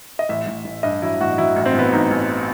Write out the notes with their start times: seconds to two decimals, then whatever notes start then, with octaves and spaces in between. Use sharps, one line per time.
0.19 D#5
0.29 A1 E5
0.47 A1
0.65 A1
0.83 G2 D#5
1.02 F#3 E4
1.21 A1 F#4
1.38 F#3 E4
1.56 A1
1.66 C4
1.74 A1 B3
1.93 A1 D#4
2.11 A1